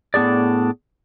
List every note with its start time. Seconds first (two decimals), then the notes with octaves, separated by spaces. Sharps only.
0.14 A2 B3 D4 G#4 D5